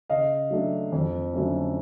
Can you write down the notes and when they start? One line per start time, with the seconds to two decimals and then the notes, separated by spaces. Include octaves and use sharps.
0.10 C#3 D#5 F5
0.50 F#3 A3 D4
0.92 F2
1.34 D3 F#3 A3 C#4